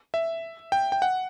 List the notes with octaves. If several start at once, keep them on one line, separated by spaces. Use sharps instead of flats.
E5
G5
G5
F#5